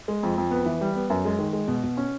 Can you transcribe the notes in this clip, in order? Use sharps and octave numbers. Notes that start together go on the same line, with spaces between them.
G#3
F2
F2
B3
E3
G3
B3
F#2
G#3
D#3
G#3
B2
B2
C#4